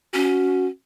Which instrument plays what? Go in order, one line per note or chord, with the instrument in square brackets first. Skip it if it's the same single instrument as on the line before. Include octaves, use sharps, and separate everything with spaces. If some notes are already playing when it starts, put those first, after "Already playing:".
[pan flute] C#4 [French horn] F#4